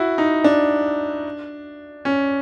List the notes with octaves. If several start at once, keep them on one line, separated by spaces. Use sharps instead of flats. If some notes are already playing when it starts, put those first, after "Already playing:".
Already playing: E4 F#4
D#4
D4
C#4